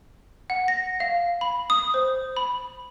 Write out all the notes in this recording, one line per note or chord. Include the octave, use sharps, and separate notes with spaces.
F#5
A#6
F5
B5
D#6
C5
B5